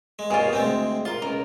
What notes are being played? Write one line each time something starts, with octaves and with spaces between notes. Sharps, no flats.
G#3
D#2 B2 F4 G#4
D2 G#3 C4 G5
F4 A#4 C6
C#2 A#4